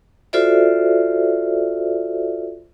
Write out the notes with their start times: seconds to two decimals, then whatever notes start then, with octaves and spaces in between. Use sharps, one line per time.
0.33 F4 F#4 A4 C5 D5 E5